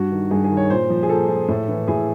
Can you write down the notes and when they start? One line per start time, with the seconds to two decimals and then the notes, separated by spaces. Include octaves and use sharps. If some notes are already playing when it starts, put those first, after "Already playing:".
Already playing: G2 F#4
0.11 D#3
0.31 G2 G#4
0.44 G#4
0.51 D#3
0.57 C#5
0.70 A#2 C5
0.90 F3
1.03 G#4
1.09 A#2 A4
1.28 F3
1.48 A2
1.68 E3
1.88 A2 G#4